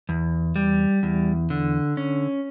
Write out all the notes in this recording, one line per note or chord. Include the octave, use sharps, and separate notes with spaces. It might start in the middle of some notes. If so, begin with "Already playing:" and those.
E2
G3
E2
D3
C#4